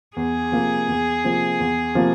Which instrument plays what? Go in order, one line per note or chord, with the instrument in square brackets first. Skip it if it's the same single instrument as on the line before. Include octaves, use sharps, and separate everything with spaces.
[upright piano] E2 [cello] G#4
[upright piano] C3 F3 A#3
E2
C3 F3 A#3
E2
C3 F3 A#3